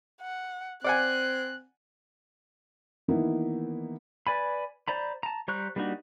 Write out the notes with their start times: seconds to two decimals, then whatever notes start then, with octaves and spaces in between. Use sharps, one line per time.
0.22 F#5
0.84 C4 D5 F#5 G#5 F#6
3.08 D#3 E3 A#3 B3 D#4 E4
4.27 B4 D5 G#5 B5
4.88 C5 D5 A#5 B5
5.23 A5 A#5
5.48 G3 C5 A#5 C#6 F#6
5.76 G3 A#3 D4 D#4 F#4